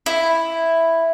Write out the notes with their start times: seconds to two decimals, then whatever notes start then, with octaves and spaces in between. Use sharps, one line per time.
0.06 E4